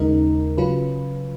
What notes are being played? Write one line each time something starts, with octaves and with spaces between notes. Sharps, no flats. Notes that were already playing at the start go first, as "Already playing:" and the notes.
Already playing: D#2 C#3 G#3 D#4 A#4
C#3 F#3 C#4 F4 B4